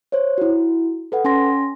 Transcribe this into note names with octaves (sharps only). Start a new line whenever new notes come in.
C5 C#5
E4 F#4
A4 B4 F#5
C#4 G#5 C6 A#6